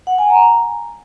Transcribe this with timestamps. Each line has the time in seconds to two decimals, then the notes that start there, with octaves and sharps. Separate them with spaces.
0.07 F#5
0.18 G#5
0.30 A#5